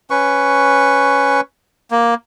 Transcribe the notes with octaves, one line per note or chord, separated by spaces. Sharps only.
C#4 B4 C#6
A#3